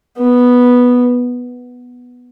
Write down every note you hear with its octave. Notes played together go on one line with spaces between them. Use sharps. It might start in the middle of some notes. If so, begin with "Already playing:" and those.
B3